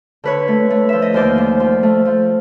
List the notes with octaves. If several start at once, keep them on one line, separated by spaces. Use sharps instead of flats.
D3 B4 C#5
A3
A3
F3 E5
D#5
D#2 C5 D5
F3
F3
A3
F3